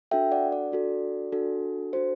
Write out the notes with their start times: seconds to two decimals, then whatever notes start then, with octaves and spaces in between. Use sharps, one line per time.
0.11 D4 F#4 A4 E5 G5
0.32 D5 F#5
0.52 D5
0.72 D4 F#4 A4
1.32 D4 F#4 A4
1.93 D4 F#4 A4 C5